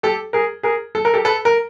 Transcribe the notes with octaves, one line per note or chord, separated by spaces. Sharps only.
G4 A4
G#4 A#4
G#4 A#4
A4
A#4
G4 A4
A4 B4
A#4